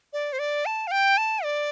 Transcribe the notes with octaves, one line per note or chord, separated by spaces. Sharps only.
D5
C5
D5
A5
F5
G5
A5
D5